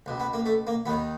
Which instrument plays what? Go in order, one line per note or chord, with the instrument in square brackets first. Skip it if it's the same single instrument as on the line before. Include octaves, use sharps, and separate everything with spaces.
[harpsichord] C#2 B2
B3
A#3
A3
A#3
D#2 B3
D#3